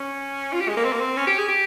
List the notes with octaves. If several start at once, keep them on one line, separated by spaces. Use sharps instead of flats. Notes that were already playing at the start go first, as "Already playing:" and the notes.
Already playing: C#4
F4
G4
G#3
A#3
C4
A#3
C4
C#4
G4
G#4
G4